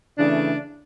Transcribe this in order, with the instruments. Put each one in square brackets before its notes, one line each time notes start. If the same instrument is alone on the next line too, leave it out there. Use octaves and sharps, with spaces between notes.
[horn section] C#3 E3 A3 D4